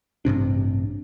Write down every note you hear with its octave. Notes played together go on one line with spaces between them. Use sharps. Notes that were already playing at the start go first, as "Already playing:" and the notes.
A1 G2 C3 D4